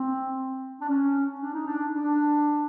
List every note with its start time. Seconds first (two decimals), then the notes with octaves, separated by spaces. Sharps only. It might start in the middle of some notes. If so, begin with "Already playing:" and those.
Already playing: C4
0.80 D4
0.89 C#4
1.41 D4
1.54 D#4
1.66 D4
1.94 D4